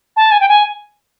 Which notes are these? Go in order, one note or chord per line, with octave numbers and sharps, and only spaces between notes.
A5
G#5
G5
G#5